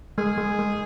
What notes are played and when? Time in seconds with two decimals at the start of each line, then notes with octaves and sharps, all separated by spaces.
0.18 G#3 G#4
0.38 G#3
0.59 G#3